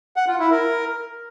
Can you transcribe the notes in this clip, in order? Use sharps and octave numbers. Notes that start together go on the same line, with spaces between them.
F#5
F4
E4
A#4